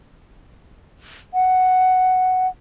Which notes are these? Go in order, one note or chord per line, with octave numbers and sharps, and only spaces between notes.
F#5